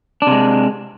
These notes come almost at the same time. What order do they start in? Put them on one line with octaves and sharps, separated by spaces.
D4 C3 G#3